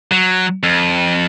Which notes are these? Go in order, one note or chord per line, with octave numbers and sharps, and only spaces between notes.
F#3
F2